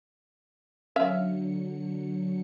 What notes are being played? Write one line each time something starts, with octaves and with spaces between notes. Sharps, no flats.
D3 F#3 C#4 E5 F5 C#7